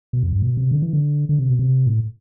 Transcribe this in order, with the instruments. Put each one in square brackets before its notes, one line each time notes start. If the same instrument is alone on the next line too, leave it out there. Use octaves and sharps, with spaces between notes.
[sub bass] B2
F2
G2
B2
C3
D3
E3
D3
D3
C3
B2
C3
A2